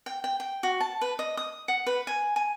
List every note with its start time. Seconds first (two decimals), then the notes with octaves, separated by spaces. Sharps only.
0.06 G5
0.24 G5
0.40 G5
0.63 F#4
0.80 A5
1.01 B4
1.19 D#5
1.37 D#6
1.68 F#5
1.87 B4
2.07 G#5
2.36 G#5